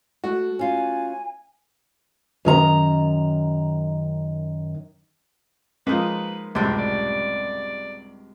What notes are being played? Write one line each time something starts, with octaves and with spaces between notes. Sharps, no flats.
A3 F#4
C#4 F4 G#5
F#2 D#3 A#5
F3 G#3 A#3 D#4 B4
C#2 F#2 A2 C3 G3 C4 D4
D5